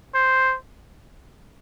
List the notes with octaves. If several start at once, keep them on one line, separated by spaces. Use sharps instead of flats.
C5